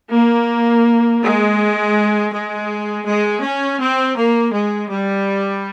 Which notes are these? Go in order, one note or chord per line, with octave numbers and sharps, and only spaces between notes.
A#3
G#3
G#3
G#3
C#4
C4
A#3
G#3
G3